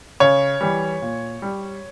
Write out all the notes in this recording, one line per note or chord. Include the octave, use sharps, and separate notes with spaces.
C#3 C#5
E3 G3
A#2
G3